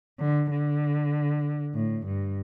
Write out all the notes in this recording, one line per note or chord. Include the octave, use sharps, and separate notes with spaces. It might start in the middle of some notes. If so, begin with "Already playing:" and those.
D3
D3
A2
G2